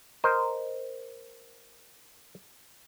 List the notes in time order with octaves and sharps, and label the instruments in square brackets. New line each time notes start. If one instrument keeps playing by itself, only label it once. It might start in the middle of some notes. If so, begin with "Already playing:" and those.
[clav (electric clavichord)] A#4 C5 D#5